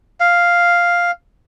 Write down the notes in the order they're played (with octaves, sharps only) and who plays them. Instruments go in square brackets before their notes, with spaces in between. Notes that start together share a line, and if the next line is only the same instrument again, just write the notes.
[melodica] F5